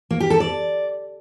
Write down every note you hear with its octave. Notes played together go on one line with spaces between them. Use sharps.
A#3
G4
A4
D5